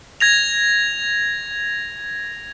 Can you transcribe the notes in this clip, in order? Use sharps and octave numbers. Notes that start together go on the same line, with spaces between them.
G#6 A#6 F7